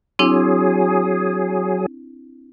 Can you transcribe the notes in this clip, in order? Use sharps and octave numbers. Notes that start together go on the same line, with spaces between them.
F#3 C4 D4 E4 G#4